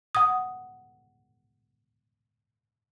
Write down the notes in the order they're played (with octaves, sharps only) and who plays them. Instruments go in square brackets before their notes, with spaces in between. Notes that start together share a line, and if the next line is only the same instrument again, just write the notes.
[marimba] F#5 D#6